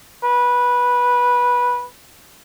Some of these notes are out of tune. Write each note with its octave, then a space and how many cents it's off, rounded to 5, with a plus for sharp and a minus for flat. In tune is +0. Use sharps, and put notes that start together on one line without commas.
B4 -15